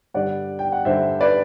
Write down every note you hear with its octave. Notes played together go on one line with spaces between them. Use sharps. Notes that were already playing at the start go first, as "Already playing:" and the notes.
G2 D3 G3 D5 F#5
G5
F#5
G2 D3 G3 C5 E5
B4 D5